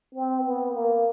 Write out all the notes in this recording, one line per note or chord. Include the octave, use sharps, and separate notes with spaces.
C4
B3
A#3